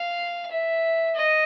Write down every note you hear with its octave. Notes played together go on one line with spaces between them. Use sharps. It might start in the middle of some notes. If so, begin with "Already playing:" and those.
Already playing: F5
E5
D#5